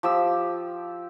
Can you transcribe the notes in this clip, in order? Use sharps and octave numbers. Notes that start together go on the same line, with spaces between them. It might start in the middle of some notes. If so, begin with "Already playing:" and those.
F3 G4 E6